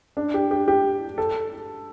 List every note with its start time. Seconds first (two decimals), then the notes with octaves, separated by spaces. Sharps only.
0.17 D4
0.34 G4
0.51 G4
0.68 G4
1.18 A4